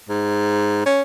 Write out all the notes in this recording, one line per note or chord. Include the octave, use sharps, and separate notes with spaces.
G#2
C#4